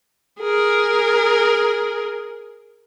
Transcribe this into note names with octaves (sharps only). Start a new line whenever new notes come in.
G#4 A#4